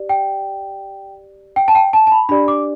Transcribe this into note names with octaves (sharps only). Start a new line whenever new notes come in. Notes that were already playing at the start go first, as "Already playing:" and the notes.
Already playing: G4 D5
G5
G5
A5
G5
A5
A5
B5
D4 G4 D5 B5
D6